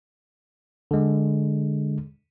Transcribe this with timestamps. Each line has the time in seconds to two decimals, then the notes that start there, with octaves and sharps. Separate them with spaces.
0.91 D3 G#3